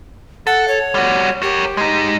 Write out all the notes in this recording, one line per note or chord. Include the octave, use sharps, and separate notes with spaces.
A4 F#5
C#5
G3 F#4
G4 A#4 C#5
G#3 D#4